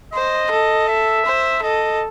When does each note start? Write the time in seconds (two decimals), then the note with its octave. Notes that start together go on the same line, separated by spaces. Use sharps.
0.13 C5 D#5
0.51 A4
0.88 E5
1.26 C5
1.63 A4 D#5